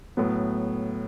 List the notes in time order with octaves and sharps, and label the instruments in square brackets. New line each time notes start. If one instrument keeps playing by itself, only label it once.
[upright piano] A2 F#3 B3